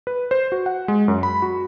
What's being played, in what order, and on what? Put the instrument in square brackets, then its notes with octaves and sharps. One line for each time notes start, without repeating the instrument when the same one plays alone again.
[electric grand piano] B4
C5
F#4
F#5
G#3
F#2
B5
F#4